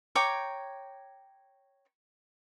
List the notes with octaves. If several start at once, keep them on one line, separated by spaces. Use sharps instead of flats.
C#5 G5 A#5 D6